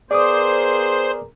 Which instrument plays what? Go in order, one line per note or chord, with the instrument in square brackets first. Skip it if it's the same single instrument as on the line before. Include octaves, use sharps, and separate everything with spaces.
[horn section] B3 G#4 A#4 [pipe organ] C5 [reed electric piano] D5 D6 D#6